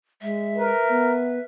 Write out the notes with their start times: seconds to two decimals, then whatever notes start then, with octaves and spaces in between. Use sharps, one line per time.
0.22 G#3 E5
0.57 A#4 B4
0.90 B3